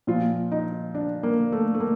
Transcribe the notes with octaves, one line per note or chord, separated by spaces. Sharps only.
A#2 F3 F4
D#4
D4
A#3
A3
A3
A#3